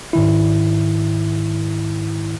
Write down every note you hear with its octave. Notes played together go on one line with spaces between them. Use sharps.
G#2 D#3 E4